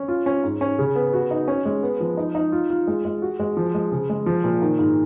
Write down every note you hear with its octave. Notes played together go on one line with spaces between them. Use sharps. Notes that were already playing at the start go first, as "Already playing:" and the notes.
Already playing: C#4
F4
C#4
G#2
C#4
C#3
B3
F#4
D#4
C#4
G#3
B3
F3
D#4
D#4
F4
F4
G#3
G#3
F#4
G#3
F3
G#3
C#3
G#3
F3
A#2
D#3
G#2